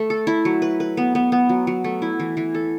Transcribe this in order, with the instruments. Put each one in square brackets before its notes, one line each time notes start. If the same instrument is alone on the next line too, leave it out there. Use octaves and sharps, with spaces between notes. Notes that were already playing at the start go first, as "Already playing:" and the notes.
Already playing: [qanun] A3
A4
E4
F#3
B4
B4
B3
B3
B3
F#3
F#3
A3
E4
E3
E3
A4